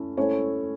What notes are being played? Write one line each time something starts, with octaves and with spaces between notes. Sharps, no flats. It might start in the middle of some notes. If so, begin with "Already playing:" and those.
Already playing: A3 C#4 E4 A4
A3 C#4 E4 A4 C5 C#5